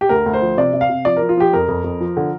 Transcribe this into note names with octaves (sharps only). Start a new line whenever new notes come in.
G4
D2 A#4
D2
C5
F3
C3 D5
C3
F5
C3
F3 D5
A#4
F3
F4
F3 G4
F2 A#4
F2
F2
F3
D3